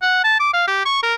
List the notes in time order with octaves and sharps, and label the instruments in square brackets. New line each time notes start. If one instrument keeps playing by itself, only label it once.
[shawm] F#5
A5
D6
F5
G4
C#6
A#4